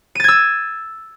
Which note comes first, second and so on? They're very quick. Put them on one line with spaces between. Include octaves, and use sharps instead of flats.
D#7 A6 G#6 E6